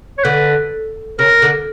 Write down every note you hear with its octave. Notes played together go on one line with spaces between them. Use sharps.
C#5
D3 B4
C#3 A#4
D3